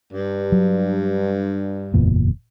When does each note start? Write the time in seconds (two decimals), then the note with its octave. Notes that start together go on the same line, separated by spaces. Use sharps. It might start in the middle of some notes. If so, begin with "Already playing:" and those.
0.13 G2
0.52 F#3
1.94 F#1 E2 A#2